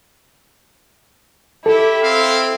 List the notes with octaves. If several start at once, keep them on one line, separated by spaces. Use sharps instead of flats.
E4 G4 A4
C4 F5